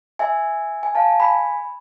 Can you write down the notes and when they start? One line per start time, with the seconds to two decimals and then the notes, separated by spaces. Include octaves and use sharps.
0.19 E5 G#5
0.83 G#5
0.95 F5 A5
1.20 G#5 B5